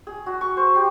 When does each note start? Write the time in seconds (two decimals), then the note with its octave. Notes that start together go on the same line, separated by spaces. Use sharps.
0.07 G#4
0.26 F#4
0.41 C#6
0.57 C5
0.75 G4